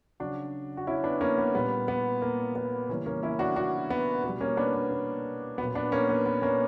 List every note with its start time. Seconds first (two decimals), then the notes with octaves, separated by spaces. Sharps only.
0.20 C#3 F#3 D4 F#4
0.77 F#4
0.87 C#4 E4
1.04 B3 D4
1.21 A#3 C#4
1.38 B3
1.55 A#2 G3 B3
1.88 B3
2.22 A#3
2.56 B3
2.89 C#3 E3 G3 A#3 C#4
3.06 A#3 C#4
3.23 C#4 E4
3.39 D4 F#4
3.56 D4 F#4
3.90 B3
4.24 B2 B3
4.29 G3
4.41 A#3 C#4
4.57 B3 D4
4.74 B3
4.91 A#3 C#4
5.58 A#2 F#3 B3
5.75 B3 D4
5.92 A#3 C#4
6.09 B3
6.26 B3
6.42 A#3 C#4